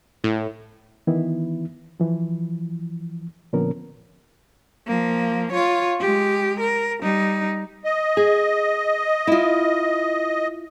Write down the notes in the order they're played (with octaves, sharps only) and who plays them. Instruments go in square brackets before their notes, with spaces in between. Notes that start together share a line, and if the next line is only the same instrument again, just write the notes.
[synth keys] A2
[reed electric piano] D#3 E3 B3 E4
E3 F3
A#2 D3 F3 B3 C#4 A#4
[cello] F3 A#3
F4 C#5
G#3 G4
A#4
G3 D#4
[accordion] D#5
[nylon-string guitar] G#4
E4 F4